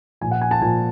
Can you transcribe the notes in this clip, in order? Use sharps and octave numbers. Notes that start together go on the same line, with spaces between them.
A#2 F3 G#5
F#5
G#5
A5
A#2 F3 G#5